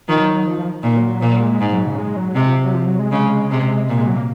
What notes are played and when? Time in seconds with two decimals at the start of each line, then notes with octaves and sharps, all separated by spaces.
0.08 D#3 F3
0.20 F#3
0.33 F#3
0.46 F3
0.58 F3
0.83 A#2 D#3
0.97 F#3
1.09 F#3
1.21 A#2 F3
1.31 F#3
1.41 G#3
1.51 G#3
1.60 G#2
1.73 F#3
1.86 C#3
1.98 G#3
2.16 F#3
2.35 C3 G#3
2.46 F3
2.64 F#3
2.74 F3
2.86 F#3
2.99 G#3
3.12 C#3 G#3
3.51 C3
3.89 A#2
3.97 G#3
4.07 F#3
4.16 A#3